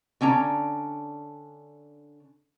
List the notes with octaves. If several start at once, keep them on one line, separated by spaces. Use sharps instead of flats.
D3 C#4 D4 A#5